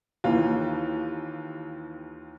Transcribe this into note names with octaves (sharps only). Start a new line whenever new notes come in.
D#2 E3 F4